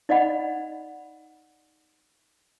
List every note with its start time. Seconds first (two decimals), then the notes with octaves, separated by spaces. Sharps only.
0.09 D#4 D5 D#5 F#5 B5